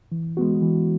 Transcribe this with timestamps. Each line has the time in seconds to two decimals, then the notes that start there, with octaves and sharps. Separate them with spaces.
0.12 E3
0.37 G#3 B3 F#4
0.62 E3